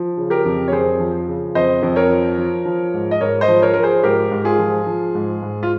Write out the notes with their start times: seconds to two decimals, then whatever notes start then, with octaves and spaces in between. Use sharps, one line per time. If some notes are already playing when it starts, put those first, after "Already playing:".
Already playing: F3
0.17 C#3
0.30 G4 A#4
0.45 F2
0.68 C#5
0.72 F2 G#4 C5
0.99 F3
1.28 C#3
1.55 F2 C5 D#5
1.82 F2
1.96 A#4 C#5
2.10 F3
2.38 F3
2.65 F3
2.94 G#2
3.11 D#5
3.21 G#2 A#4 C#5
3.41 C5 D#5
3.48 F3
3.62 A#4 C#5
3.74 F3 A#4
3.83 G#4 C5
4.03 G#2 G4 A#4
4.31 G#2
4.45 F4 G#4
4.59 F3
4.86 F3
5.15 G#2
5.43 G#2
5.63 F4